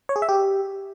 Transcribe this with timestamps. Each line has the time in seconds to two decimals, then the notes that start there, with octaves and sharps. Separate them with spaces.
0.09 C#5
0.16 G#4
0.22 E5
0.29 G4